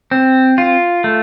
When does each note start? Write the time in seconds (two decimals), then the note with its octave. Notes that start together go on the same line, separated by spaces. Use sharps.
0.11 C4
0.58 F4
1.04 A3